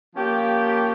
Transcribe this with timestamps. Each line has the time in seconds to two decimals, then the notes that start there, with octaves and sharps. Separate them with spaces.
0.14 F3 A#3 C#4 G4